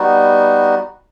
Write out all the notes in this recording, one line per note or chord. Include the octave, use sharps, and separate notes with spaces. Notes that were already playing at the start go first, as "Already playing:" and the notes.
Already playing: G3 B3 D#4 F#4